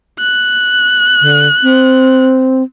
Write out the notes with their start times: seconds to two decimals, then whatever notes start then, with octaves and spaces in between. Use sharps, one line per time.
0.20 F#6
1.21 D3
1.63 C4